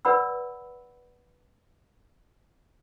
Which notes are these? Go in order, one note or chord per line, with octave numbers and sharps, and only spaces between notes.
B4 D5 F#5 B5 E6